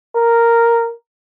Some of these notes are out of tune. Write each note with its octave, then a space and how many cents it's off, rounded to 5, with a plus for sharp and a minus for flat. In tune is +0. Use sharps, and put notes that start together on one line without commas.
A#4 -5